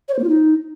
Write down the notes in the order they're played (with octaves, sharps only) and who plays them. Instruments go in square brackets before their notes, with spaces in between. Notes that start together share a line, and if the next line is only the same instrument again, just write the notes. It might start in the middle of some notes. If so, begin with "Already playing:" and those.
[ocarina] C#5
C5
A#3
F4
D#4